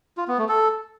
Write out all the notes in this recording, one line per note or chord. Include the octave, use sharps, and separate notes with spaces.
F4
B3
A3
A4